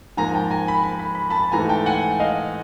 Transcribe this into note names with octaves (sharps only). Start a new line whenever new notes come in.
G#2 F3 A#3 G#5 A#5
G5 A5
G#5 A#5
B5
B5
B5
B5
A5 B5
G#2 E3 A3 G#5 A#5
G5 A5
F#5 G#5
D#5 F5